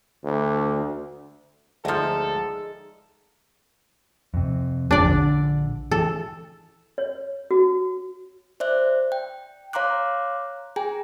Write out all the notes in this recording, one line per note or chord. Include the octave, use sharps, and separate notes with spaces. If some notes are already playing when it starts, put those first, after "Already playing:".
D2
D2 F3 G#3 D#4 A4
F2 C3
E1 F3 D4 D5
A#1 D3
E3 A4
C#5
F#4
C5 D5 E5 F#6
G5
C#5 F5 A#5 C6 D6 F#6
G#4 G5 G#5 A#5